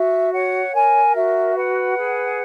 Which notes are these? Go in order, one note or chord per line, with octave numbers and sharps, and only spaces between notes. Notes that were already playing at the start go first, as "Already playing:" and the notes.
Already playing: F#4 E5
C#5 F#5
A#4 G#5
F#4 E5
B4 F#5
G#4